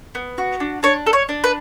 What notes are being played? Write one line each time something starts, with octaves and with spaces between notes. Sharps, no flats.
B3
F#4
D4
D4 C#5
A4
C#5
D4
B4